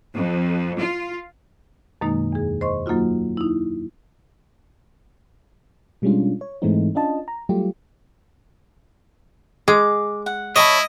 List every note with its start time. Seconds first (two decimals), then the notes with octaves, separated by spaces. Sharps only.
0.15 F2
0.79 F4
2.01 F#2 B2 D#3 G#3 A#3 D#4
2.32 E2 G#4
2.61 C5 D#5 C6 C#6
2.86 F#3 A#3 D#4 F4 F#4
3.37 D#4 E4
6.02 B2 G3 G#3 C#4 D4 F4
6.41 C#5
6.62 G#2 E3 G#3 A3 C4 D#4
6.95 C#4 D4 F4 D#5 A5
7.28 A#5
7.49 F#3 G3 A3 F4 G4
9.68 G#3 D6
10.26 F#5
10.56 E4 C#5 D#5 A5 B5